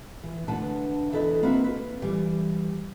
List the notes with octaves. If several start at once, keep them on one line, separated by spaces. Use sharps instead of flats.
E3
D2 D4 B4 F#5 A5
E2 E4 A4 B4 D#5
A#3 C4 E4 F#4 A4 B4
B4
E3 G3 G5